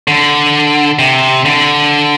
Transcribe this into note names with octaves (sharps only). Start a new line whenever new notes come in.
D3
C3
D3